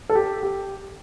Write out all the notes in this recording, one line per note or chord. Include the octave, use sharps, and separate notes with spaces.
A4
G4
G4